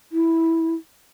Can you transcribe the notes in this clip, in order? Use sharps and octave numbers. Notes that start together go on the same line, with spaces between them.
E4